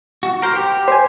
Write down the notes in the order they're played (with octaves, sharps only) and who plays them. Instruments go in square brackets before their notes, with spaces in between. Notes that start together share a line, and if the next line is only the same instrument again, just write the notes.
[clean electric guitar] F#4
A#4 C5
G4
[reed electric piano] C5 G#5